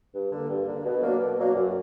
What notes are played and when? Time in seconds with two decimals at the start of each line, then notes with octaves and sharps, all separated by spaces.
0.14 G2
0.31 D3 A#3
0.49 G2
0.67 D3 A#3
0.85 B2
1.02 F#3 A#3 D4
1.19 B2
1.38 F#3 A#3 D4
1.55 F#2